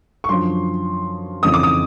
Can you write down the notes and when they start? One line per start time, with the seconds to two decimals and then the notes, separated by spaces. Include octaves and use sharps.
0.24 C#6
0.29 F#2 D3 F3 C6
1.43 F2 C#3 E3 D#6
1.54 D6
1.63 D#6